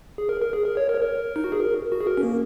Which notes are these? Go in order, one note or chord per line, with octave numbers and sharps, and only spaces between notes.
G#4
A#4
A#4
G#4
A#4
C#5
A#4
C#5
A#4
D#4
F#4
G#4
A#4
F#4
G#4
A#4
C#4
A#3